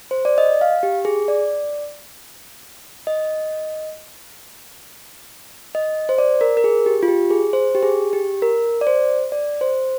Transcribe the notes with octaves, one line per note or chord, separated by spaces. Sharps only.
C5
D5
D#5
F5
G4
G#4
D5
D#5
D#5
C5
D5
A#4
A#4
G#4
G4
F4
G4
G#4
C5
G4
G#4
G4
A#4
D5
C5
D5
C5